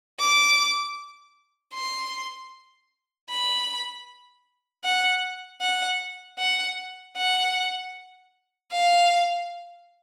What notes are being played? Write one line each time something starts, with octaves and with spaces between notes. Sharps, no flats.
D6
C6
B5
F#5
F#5
F#5
F#5
F5